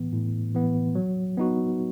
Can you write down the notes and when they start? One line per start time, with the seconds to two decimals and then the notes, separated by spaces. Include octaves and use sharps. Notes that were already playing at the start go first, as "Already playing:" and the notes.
Already playing: A2 E3 B3
0.12 A2
0.55 E3 B3
0.95 F#3
1.37 B3 D#4 F#4